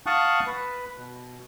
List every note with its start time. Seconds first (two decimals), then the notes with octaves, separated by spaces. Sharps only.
0.06 F5 F#5 A5 C#6 D#6 F#6
0.46 B4
0.98 B2